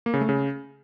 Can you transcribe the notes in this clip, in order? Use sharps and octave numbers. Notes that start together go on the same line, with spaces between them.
A#3
C#3
A3
C#3